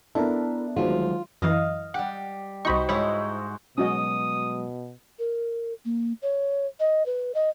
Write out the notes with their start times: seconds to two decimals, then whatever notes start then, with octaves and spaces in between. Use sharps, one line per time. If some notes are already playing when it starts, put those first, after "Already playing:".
0.15 B3 D4 E4 A4 A#4
0.76 D2 D#3 F3 F#3 G#3 F4
1.42 F#2 E3 D#5 F5
1.94 G3 G4 F#5
2.65 C2 D#4 F#4 C5 B5 C#6
2.89 G#2 G#3 E4 C#5 B5
3.78 B2 F#3 G#3 C#4 F#4 D#5 D#6
5.19 A#4
5.85 A#3
6.22 C#5
6.80 D#5
7.06 B4
7.35 D#5